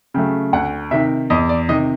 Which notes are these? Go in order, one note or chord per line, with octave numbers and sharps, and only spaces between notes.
C#3 F#3 A3 G5
D2 F#5
C3 D#3 E5
E2 D#5
D5
C3 D#3 D#5